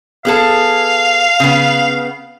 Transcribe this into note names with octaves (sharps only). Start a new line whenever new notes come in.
B3 G#4 A4 F5
C#3 B3